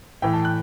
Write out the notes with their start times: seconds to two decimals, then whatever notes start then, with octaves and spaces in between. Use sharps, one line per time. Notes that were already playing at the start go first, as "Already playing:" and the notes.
0.22 A2 E3 G5
0.34 A5
0.45 F#6